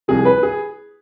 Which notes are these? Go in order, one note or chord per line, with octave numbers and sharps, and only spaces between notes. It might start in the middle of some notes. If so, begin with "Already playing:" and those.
C2 C3 F3 G#4
B4
G#4